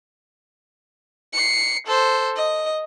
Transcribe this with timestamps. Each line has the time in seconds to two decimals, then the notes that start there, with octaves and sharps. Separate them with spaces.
1.33 C7 C#7
1.87 A4 C5
2.36 D#5